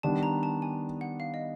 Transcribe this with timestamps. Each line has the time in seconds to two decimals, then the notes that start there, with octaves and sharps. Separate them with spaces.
0.03 D#3 G3 B3 D4 A5
0.23 A#5
0.43 A5
0.62 G#5
1.01 F#5
1.20 F5
1.34 D#5